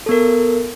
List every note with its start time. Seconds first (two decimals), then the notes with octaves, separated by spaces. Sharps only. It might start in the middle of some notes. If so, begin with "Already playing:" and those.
0.06 A4
0.09 B3
0.11 A#4